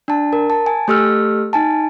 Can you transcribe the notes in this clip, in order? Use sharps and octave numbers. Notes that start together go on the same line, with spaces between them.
D4 A5
A#4
A5
G#5
A3 G4 A4 E6 F6
D#4 G#5 A5